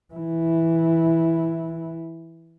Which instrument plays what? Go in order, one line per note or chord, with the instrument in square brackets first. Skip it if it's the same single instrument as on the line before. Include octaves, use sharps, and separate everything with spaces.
[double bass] E3 E4